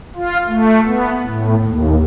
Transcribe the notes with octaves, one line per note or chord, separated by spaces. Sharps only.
F4
A3
B3
A2
D#2